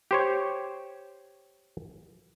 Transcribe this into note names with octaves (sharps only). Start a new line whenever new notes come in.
G4 C5 C#5